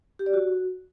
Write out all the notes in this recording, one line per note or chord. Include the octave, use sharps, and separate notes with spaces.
G4
D5
F#4